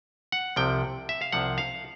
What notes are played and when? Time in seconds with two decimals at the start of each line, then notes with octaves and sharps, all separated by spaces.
0.32 F#5
0.56 C2 C3 F3 G5
1.09 E5
1.22 F5
1.32 C2 C3 F3 F#5
1.58 F5